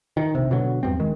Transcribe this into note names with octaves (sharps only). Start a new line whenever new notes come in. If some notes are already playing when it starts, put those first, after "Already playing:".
D#3
A#1 C3
B2 D3 F#3
E2 G2 C4
D1 D#3 G#3